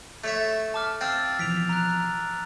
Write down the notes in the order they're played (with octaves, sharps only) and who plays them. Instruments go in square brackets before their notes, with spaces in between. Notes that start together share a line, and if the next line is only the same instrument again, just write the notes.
[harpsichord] A3 C#5 E5
[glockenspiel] A5 D6 F6
[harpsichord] C4 G5 [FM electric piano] F5 [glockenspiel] E6 F6 A6
[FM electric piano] B2 E3 F3 [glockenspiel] B6 D7 F7
[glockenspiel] A#5 F#6